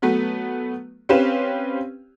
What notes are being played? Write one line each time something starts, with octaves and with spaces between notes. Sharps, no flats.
F#3 A3 B3 B4
C4 C#4 G4 B4 F5 E7